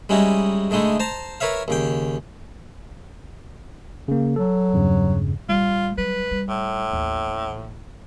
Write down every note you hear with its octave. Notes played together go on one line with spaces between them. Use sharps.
G3 G#3 C#4 D#4 E4 F#4
D3 G#3 A3 D#4 E4
C5 A5 A#5
A#4 B4 C#5 E5 F5
D#2 C#3 G5
C#3 A#3
F#3 A4
E2 G2 C#3
A1 G3 F4
F#3 G3 B4
G3
A2
A1 D#2